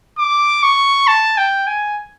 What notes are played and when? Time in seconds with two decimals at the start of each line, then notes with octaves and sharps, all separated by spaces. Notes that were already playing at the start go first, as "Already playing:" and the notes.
0.18 D6
0.63 C#6
1.08 A5
1.38 G5
1.67 G#5